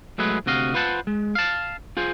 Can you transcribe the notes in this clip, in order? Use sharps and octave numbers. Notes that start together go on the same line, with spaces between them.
F#3 G#3 A3 G#4 B4
D2 C3 F#4 D#5 F5
F4 B4 C5 F#5 A5
G#3
F5 A5
F4 G#4 C5